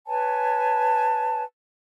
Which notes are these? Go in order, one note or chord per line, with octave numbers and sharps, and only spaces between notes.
B4 C#5 G#5 A5